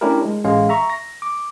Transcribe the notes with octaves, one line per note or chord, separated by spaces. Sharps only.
A3 C#4 D4 E4 G4 A#4
G#3
A1 G#3 C#4 F5
E5 A#5 C#6
A#6
D6